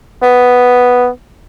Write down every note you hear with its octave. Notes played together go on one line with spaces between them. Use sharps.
B3